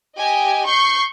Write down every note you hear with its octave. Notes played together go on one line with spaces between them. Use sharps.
G4 D#5 G#5
C#6 G6 C7 C#7